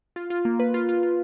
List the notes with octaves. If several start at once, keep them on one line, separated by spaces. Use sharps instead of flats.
F4
F4
A#3
B4
F4
F4
F4